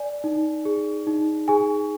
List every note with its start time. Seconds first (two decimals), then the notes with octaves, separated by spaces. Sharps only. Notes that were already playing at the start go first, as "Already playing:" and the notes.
Already playing: D5 G#5
0.24 D#4
0.65 G#4
1.07 D#4
1.48 G#4 G#5